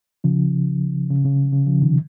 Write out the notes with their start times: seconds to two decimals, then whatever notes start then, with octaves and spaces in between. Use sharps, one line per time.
0.24 C#3 F3
1.10 C#3
1.25 C#3
1.53 C#3
1.66 C#3 F3
1.82 C3 D#3